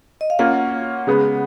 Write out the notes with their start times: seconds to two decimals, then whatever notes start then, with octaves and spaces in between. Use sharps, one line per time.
0.21 D#5
0.30 F5
0.39 A#3 C#4 F4 F#5
1.07 C#3 G#3 B3